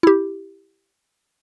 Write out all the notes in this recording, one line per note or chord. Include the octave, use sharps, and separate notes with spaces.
E4 G4